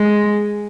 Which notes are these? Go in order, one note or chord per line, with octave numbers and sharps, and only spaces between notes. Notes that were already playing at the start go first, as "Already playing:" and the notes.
Already playing: G#3